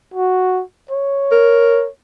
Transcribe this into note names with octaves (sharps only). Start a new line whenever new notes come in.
F#4
C#5
A#4